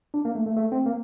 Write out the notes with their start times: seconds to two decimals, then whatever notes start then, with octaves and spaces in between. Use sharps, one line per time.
0.14 D4
0.25 A#3
0.35 A3
0.46 A3
0.57 A3
0.72 C4
0.86 A#3